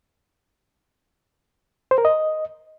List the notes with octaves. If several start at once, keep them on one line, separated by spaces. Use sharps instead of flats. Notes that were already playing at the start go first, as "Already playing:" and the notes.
C5
A#4
D#5